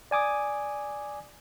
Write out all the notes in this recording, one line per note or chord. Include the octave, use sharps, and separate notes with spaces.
D5 G#5 D6 D#6